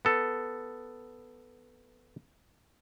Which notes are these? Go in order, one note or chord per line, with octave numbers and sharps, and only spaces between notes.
B3 A4